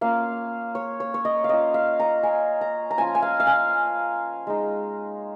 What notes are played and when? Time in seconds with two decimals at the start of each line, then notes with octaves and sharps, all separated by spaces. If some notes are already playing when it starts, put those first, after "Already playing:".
0.01 A#3 C#4 F4 F5
0.75 C#5
1.00 C#5
1.14 C#5
1.25 D#5
1.44 F5
1.49 A#3 C#4 F4 D#5
1.74 F5
2.00 A#5
2.23 G#5
2.61 A#5
2.91 A#5
2.98 F3 C#4 F4 G#5
3.15 G#5
3.22 F5
3.40 F5
3.47 G#5
4.47 G#3 D#4